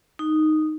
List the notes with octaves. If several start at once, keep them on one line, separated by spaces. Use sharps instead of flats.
D#4